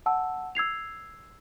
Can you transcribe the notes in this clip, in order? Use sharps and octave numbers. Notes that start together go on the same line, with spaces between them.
F#5 A5 E6
E6 G#6 C7 F7